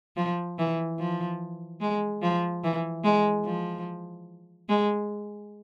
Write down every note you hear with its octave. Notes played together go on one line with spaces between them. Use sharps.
F3
E3
F3
G#3
F3
E3
G#3
F3
G#3